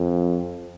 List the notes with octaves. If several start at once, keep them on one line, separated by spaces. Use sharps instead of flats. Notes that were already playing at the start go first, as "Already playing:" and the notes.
Already playing: F2